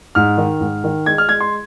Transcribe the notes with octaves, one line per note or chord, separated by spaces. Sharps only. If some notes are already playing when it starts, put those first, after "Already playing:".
G#2 F6
D#3
G#2
D#3
G#3 G#6
F6
G#3 G#6
C6